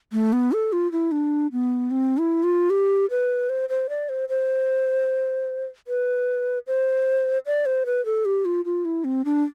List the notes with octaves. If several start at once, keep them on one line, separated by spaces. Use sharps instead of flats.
A3
B3
A4
F4
E4
D4
B3
C4
E4
F4
G4
B4
C5
C5
D5
C5
C5
B4
C5
D5
C5
B4
A4
G4
F4
F4
E4
C4
D4